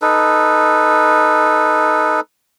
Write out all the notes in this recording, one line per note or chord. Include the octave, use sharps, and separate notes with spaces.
D#4 A4 B4